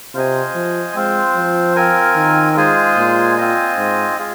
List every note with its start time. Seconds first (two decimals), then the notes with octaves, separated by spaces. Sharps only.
0.14 C3 F4 C5 D#5 G#5
0.55 F3
0.95 G#3 C4 F4 C5
1.35 F3
1.76 C4 F4 A#4 G#5
2.16 D#3
2.56 G#3 F4 G#4 C5 G#5
2.97 A#2
3.37 C4 F4 C5 D#5 G#5
3.77 G#2
4.18 G#3 F4 G#4